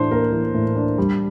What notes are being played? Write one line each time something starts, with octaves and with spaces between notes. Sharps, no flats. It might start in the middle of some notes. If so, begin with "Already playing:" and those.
Already playing: A2 E3 D4 C5
A#3 A#4
E3
A2
D4
G3